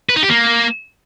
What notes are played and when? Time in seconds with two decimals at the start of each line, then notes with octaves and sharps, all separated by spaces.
0.09 B4
0.16 D#4
0.23 G4
0.30 A#3